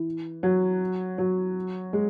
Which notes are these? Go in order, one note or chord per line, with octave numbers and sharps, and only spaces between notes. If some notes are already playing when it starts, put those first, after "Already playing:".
Already playing: E3
F#3
F#3
G#3